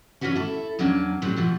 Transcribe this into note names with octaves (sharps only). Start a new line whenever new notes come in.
E3 C#4 D4 F#4 B4 C#5
E4 A4
E2 F#3 A#3 C#4 D4
A2 C3 F#3 G3
B2 E3 F3